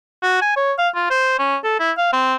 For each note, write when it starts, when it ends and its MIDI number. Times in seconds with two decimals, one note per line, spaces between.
0.23 0.38 66
0.42 0.54 80
0.56 0.73 73
0.78 0.88 77
0.95 1.08 65
1.10 1.34 72
1.39 1.56 61
1.64 1.79 69
1.80 1.91 64
1.97 2.11 77
2.13 2.36 60